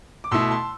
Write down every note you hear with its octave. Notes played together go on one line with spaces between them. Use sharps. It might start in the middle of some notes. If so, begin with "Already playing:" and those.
D6
B2 A3 E4 C6 E6
A5 C6